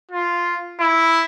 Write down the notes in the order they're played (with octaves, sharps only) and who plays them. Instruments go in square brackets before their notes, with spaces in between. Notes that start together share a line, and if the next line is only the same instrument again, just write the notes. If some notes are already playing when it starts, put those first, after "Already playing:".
[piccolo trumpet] F4
E4